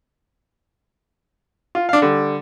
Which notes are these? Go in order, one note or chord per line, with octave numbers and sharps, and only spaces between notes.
F4
D4 F5
D3 G3